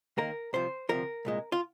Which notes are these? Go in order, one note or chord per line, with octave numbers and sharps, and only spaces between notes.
D#2 D#3 A#3 A#4
C2 C3 F3 C5
D2 C3 F3 A#4
C2 A#2 G#3
F4